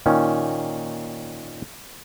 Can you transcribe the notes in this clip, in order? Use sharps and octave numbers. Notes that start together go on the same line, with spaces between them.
A#2 D#3 C#4